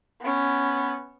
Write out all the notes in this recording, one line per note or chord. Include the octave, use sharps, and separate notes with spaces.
B3 C#4